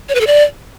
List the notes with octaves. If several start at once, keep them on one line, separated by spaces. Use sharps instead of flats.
C#5
B4
A4
D5